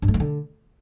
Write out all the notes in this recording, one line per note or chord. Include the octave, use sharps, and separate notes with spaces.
G2
A3
D#3
D3